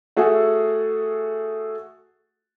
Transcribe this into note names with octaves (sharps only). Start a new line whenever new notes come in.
A3 F#4 G#4 A4 E5